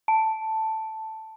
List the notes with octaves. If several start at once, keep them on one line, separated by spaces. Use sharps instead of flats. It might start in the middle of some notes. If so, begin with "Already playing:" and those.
A5